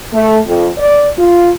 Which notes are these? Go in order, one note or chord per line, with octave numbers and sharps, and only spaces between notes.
A3
F2
D5
F4